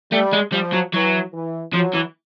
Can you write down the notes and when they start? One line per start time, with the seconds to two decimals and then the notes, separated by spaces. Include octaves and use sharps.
0.12 G3 A3
0.33 G#3
0.52 F3 G3
0.72 F#3
0.93 E3 F#3
1.33 E3
1.74 F3 F#3
1.94 E3